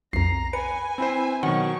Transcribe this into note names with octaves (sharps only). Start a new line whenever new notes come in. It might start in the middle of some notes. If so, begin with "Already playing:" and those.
B1 F2 A#5 C7
B4 G#5 C#7
C4 E4 C5
B2 D#3 F#3 F#5 C#6